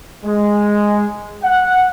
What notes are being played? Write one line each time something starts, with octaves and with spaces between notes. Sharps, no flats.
G#3
F#5